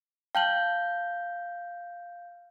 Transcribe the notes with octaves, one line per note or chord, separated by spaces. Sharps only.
F5 G5 A5 G6 F#7